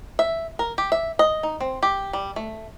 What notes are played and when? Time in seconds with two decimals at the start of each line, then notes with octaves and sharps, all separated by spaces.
0.19 E5
0.59 A#4
0.78 G4
0.92 E5
1.19 D#5
1.43 D#4
1.61 C4
1.83 G4
2.13 G3
2.36 A3